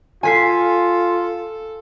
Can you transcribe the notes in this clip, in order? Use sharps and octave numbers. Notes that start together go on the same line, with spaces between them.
F4 A4 G#5 B6 C7